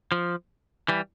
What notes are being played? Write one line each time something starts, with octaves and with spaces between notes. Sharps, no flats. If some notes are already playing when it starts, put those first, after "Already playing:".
F3
E3 G3